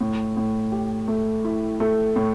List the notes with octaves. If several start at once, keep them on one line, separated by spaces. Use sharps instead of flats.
A2
A2
G4
A3
E4
A3
A2